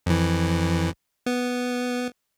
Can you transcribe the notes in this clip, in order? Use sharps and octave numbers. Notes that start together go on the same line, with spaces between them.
F2 E3
B3